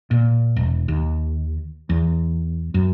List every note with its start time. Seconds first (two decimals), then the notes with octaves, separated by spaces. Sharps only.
0.11 A#2
0.56 E1
0.88 D#2
1.89 E2
2.74 F#2